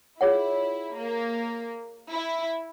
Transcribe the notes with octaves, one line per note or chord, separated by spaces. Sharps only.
E4 F4 G#4 C#5 F#5
A#3
E4